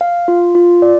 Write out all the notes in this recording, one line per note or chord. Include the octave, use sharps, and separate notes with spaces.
F5
F4
F4
D5